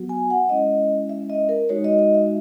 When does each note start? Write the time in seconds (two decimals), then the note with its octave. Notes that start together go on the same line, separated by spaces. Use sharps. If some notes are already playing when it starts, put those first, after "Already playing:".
Already playing: F#3 B3 F#4
0.09 G#5
0.30 F#5
0.49 G#3 C#4 E4 D#5
1.09 E5
1.30 D#5
1.49 A#4
1.69 G#3 D#4 F#4 C#5
1.84 D#5
1.99 D#5
2.14 E5